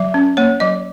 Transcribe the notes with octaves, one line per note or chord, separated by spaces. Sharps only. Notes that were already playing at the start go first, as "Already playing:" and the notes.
Already playing: F#3 E5
C#4
A#3 C#5
F#3 D#5